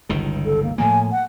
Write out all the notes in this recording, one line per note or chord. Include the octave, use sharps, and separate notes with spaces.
G1 C#2 D#3
A4
A#3
A2 F3 A#3 G#5
F#5